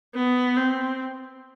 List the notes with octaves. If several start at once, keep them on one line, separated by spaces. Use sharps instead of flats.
B3
C4